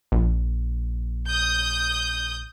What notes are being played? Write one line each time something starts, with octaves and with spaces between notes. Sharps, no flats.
A#1
D#6 G6